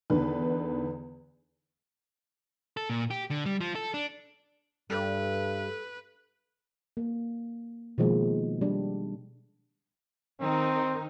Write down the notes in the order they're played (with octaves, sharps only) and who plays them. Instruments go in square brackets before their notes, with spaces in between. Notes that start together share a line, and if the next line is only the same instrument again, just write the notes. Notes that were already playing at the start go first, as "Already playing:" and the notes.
[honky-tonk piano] E2 D3 D#3 B4
[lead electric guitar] A4
A#2
G4
D3
G3
F3
A4
D4
[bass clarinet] G2 [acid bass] G3 [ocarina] A4 [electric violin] B4
[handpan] A#3
B2 D#3 F3 G#3 A#3 C4
G3 D4
[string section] D#3 D#4 [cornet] C4